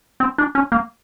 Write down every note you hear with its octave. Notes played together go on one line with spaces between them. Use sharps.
C4
D4
C#4
A#3